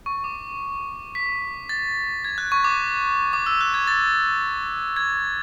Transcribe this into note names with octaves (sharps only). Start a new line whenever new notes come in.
C#6
D6
B6
A6
G#6
F#6
C#6
D6
D6
E6
F#6
G#6
A6
G#6